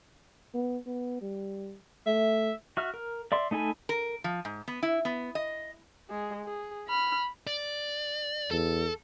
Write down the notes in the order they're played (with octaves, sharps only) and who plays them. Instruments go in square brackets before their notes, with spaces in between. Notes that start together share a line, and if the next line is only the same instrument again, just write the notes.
[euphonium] B3
B3
G3
[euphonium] A3 [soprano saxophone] E5
[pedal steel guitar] F#4 E5 F6
A#4
D5 E5 C6
A3 D#4 A4 G#5 B5
[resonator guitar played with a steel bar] A#4
F3
G#2
B3
E4
B3
D#5
[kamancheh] G#3 G#4
G#4
B5 F6
[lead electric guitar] D5
[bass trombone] E2 [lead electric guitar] A4